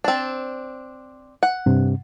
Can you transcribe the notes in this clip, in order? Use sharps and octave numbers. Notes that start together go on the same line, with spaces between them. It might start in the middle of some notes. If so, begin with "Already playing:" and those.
C4 D4
F#5
G2 C3